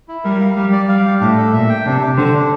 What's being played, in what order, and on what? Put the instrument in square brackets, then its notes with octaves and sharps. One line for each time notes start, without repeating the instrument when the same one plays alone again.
[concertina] E4
[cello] G3 [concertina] A#4
[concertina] F5
[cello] G3 [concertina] G4
[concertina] D5
[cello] G3 [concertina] F5
[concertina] G4
[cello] A2 [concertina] D4
[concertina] A4
[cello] A#2 [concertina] E5
[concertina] G5
[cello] C3 [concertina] D4
[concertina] G4
[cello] D3 [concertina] C5
[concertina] D4